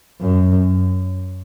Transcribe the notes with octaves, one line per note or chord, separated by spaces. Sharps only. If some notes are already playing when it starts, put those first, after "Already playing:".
F#2